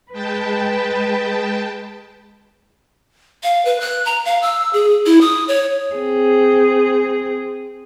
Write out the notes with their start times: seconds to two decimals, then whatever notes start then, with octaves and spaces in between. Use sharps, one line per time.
0.12 G#3 B4 G5 A5
3.43 F5
3.65 B4
3.80 F#6
4.05 A#5
4.25 F5
4.42 E6
4.73 G#4
5.06 E4
5.21 D#6
5.48 C#5
5.95 C4 G#4